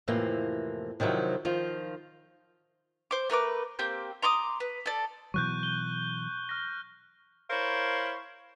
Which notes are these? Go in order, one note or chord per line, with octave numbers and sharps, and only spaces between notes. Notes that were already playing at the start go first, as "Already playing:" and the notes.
F2 A2 C3 E3 A#3
C3 D#3 F3 F#3 E4
D#3 F3 F4
C5 D6
A3 A#4 B4 D6
A#3 C4 G4 G6
A#5 C6 D6 D#6
B4
A4 D5
B2 E3 F#3 C#6 F#6 G6
G7
F6 F#6 A#6
E4 A#4 C5 C#5 F5